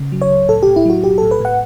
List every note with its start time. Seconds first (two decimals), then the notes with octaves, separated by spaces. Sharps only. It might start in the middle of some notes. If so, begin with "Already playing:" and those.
Already playing: C#3
0.12 F#3
0.22 C#5
0.31 C#2
0.49 A2 A4
0.63 A2 G4
0.76 E4
0.85 F#3 F#4
1.04 B1 G4
1.18 A2 A4
1.31 B4
1.40 A2 F#5